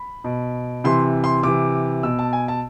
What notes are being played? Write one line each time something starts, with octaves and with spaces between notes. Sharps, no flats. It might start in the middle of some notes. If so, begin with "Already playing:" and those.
Already playing: B5
B2
C3 E3 C6
C6
C3 E3 D6
B2 E6
A5
G#5
A5